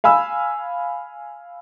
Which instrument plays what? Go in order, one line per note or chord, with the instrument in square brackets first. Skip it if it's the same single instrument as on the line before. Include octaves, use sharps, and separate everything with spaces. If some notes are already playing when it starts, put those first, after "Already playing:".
[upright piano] F5 G#5 B5 E6